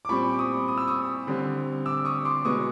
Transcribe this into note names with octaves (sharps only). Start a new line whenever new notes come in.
D6
A#2 G3 C4 B5 C#6
D6
C#6 D#6
D#6
E6
C#6 D#6
D3 G3 C4
D6 E6
C#6 D#6
C6 D6
B2 G#3 B3 C#6 D#6